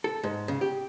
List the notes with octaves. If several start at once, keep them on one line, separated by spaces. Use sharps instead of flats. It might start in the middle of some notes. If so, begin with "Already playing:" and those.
A4
G#2
C#3
G4